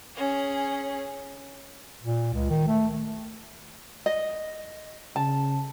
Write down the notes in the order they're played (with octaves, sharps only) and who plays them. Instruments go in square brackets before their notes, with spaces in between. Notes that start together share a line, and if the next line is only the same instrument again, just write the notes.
[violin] C#4 G#4
[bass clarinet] A#2
C#2
D#3
A3
[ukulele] D#5
[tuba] C#3 [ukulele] A5